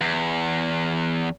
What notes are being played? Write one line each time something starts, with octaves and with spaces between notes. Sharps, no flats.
E2